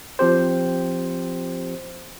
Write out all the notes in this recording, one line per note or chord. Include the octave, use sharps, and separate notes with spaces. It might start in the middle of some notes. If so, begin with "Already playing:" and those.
F3 C4 G4 C5